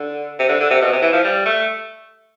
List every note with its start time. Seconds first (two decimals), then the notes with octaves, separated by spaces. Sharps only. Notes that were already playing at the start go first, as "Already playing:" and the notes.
Already playing: D3
0.39 C3
0.49 D3
0.60 D3
0.70 C3
0.81 B2
0.92 C3
1.02 E3
1.12 F3
1.24 G3
1.46 A3